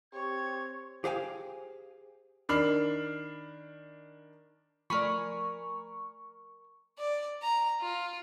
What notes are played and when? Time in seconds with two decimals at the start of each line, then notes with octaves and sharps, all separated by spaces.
0.13 C4 G4 C#5 G#6
1.04 G4 G#4 C5 F5 G5 G#5
2.49 D#3 D4 B5 F6 C7 F#7
4.90 F3 A3 A#4 D5 G#5 B5 C#6
6.98 D5
7.42 A#5
7.81 F4